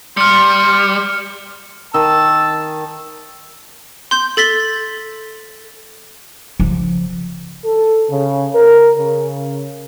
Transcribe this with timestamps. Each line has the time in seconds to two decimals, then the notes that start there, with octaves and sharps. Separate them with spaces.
0.17 G3 C6 F6 C#7
1.94 D#3 A5 E6
4.11 C6 G6
4.37 A4 A6 B6 G7
6.59 C#3 F3
7.65 A4
8.10 C#3
8.55 A#4
8.97 C#3